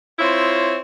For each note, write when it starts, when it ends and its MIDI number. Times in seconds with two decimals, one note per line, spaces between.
0.19 0.78 60
0.19 0.78 64
0.19 0.78 65
0.19 0.78 73